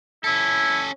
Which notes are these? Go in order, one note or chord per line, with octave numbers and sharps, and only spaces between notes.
C#4 E4 A4